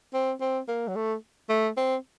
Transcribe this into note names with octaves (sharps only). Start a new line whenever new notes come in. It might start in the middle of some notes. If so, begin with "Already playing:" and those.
C4
C4
A#3
F#3
A3
A3
C4